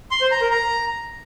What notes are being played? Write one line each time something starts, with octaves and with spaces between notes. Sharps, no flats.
C6
C5
A#5
A#4
A#5